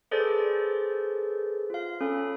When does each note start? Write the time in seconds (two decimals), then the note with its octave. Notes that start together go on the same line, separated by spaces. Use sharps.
0.11 G#4 A4 B4 C5 D5 A6
1.70 F4 F5
2.01 C#4 A4 B5